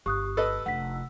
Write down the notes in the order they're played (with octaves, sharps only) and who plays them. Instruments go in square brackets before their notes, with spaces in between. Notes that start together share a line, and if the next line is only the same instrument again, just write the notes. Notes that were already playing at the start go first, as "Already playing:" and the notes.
[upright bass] G1 [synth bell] G4 [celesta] C#6 D#6 F#6
[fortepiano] A4 B4 D#5 [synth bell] E6
[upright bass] F1 D4 [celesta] F#5 B6